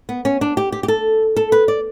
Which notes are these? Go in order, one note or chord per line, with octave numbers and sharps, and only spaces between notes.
B3
C#4
D4
G4
G4
G4
A4
A4
B4
D5